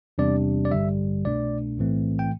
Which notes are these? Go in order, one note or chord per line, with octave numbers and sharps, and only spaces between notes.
E2 C3 G3 D4 D5
D5
A1 G2 D3 G3 E5
C2 B2 A3 D4 D5
B1 A2 E3 A3 C4
G5